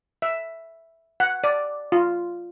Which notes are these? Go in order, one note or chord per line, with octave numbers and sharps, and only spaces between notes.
E5
F#5
D5
F4